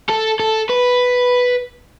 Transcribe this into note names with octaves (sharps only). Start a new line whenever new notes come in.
A4
A4
B4